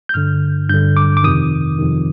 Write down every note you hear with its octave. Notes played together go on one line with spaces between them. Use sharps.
G6
G2 D3 F6
G2 D3 G6
D6
D6
F2 C3 D#3 D#6
F2 C3 D#3